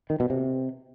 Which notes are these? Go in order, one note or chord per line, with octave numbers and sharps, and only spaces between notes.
D#3
B2
C3